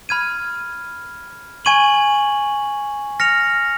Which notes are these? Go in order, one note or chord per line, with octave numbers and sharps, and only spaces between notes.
B5 F6 G#6 D#7
G#5 C#6 G#6 D#7 F#7
F6 A#6 C#7 F7